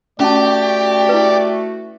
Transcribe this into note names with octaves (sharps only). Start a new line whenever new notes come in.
A3 C#4 F#4 G4 D5 A5
E4 B4